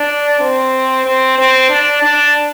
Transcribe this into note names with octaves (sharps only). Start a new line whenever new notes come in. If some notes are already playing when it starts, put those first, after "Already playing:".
Already playing: D4
C4
C4
C4
D4
D4